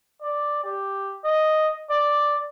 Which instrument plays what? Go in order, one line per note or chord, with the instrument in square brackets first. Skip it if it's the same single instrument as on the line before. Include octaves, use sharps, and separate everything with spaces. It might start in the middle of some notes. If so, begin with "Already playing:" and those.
[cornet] D5
G4
D#5
D5